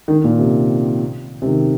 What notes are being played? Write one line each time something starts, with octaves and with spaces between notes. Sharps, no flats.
D#3
A#2
C3
C3
D#3